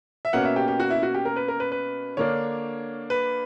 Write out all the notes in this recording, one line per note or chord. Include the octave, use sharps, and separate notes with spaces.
E5
B2 A#3 C#4 F#5
E5
G4
G4
F#4
E4
F#4
G4
A#4
B4
A#4
B4
B4
D3 A#3 D4 C#5
B4